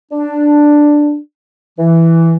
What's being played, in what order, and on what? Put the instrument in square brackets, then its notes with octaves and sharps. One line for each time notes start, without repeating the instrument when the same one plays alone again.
[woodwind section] D4
E3